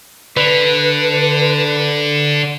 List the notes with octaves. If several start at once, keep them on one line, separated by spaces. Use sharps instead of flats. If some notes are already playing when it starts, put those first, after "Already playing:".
D3 B4